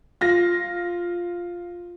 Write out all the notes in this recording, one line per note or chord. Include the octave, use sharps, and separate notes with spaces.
F4 A#6